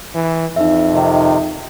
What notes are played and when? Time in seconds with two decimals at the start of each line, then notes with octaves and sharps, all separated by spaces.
0.15 E3
0.56 F2 D#4 E5
0.92 C3 D#3